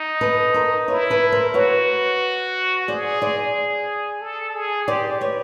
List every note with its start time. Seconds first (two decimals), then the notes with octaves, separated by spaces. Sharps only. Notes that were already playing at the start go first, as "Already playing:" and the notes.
Already playing: D#4
0.21 A4 B4
0.54 A#4 C5
0.88 E4 B4 C#5
1.10 A4 B4
1.32 A#4 C5
1.54 F#4 B4 C#5
2.88 G#4 C5 D5
3.22 C5 D5
4.21 A4
4.54 G#4
4.87 G4 C5 D5
5.21 B4 C#5